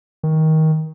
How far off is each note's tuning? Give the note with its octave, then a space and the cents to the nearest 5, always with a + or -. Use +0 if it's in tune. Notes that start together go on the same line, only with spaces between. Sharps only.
D#3 +20